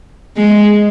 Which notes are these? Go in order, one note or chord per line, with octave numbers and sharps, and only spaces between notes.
G#3